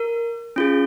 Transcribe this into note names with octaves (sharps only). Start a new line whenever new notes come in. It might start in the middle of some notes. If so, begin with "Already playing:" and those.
Already playing: A#4
C#4 F4 G#4